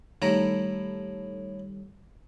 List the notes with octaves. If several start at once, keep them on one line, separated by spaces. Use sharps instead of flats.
A2 D#3 G3 E4 A4 A#5